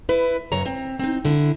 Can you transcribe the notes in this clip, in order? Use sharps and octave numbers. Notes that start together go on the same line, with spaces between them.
E4 B4
F#2 C#3 C#5 A#5
C4
C4 D#4
D3 E4